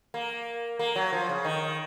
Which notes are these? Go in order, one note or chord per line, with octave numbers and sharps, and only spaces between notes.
A#3
A#3
F#3
F3
C#3
D#3